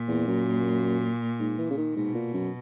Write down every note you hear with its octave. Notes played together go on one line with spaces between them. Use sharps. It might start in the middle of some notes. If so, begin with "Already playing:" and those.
Already playing: A#2
E2
F#2
G#2
E3
C#3
D#3
G#2 B2
A#2
F#2